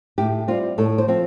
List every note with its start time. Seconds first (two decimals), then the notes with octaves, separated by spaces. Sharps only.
0.18 A2 G4
0.48 G3 C4 F4
0.78 A2 A4
0.98 C5
1.08 F3 C4